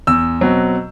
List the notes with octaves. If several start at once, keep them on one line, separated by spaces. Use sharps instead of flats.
E2 E6
B2 F#3 C4